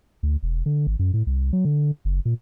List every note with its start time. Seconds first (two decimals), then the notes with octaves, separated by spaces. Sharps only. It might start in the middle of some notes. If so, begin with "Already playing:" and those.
0.23 D2
0.43 E1
0.66 D3
0.87 G#1
0.99 F#2
1.13 A2
1.27 C2
1.53 F#3
1.65 D3
2.05 F#1
2.25 A#2